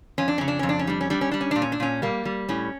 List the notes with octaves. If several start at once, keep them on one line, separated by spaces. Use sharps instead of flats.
F2 C#4
D4
C#3 C#4
D4
F2 C#4
D4
C#4
G3 D4
C#4
G3 D4
C#4
G3 D4
C#4
A#2 D4
C#4
D4
A#2 C#4
G3 A#3
G3
A2 C#4